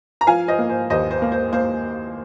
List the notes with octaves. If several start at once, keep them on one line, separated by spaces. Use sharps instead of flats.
A#5
F3 F5 G#5
C5 D#5
A#3
C5
D#2 C5 D#5
C5
A#3
C5
A#3 C5